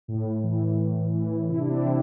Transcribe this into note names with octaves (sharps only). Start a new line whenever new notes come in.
A2
E3
A2
E3
C3 E4
D4
C4 E4
E3